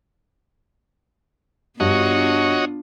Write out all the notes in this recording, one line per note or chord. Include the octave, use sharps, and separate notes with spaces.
G2 G3 B3 D4 F4 F#4 C#5 D#5